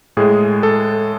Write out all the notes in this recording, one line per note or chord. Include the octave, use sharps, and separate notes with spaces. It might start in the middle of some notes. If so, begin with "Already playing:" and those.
A2 G#3 G#4
A4